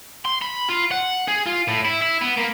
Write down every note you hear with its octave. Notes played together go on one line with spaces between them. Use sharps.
C6
B5
F4
F#5
G#4
F4
A2
E4
E4
B3
A#3